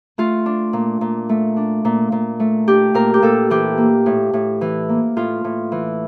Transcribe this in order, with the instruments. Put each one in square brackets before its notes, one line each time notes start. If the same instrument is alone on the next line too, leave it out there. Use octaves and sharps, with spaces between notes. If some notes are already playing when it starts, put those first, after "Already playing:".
[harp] A3 F4
D4
A#2
A#2
A3
D4
A#2
A#2
A3
D4 G4
A#2 A#4
G4
A#2 A4
E3 G4
A#3
A2
A2
E3
A#3
A2 F4
A2
E3